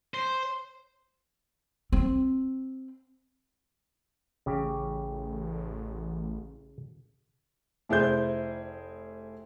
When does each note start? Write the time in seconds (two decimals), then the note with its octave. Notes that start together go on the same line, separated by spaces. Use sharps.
0.14 C5
1.92 C4
4.46 A1 C#3 G4
7.89 F1 E4 G#4 C5 G6